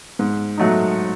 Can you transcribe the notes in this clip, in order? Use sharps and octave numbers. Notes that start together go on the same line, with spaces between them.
G#2
F#3 A3 D#4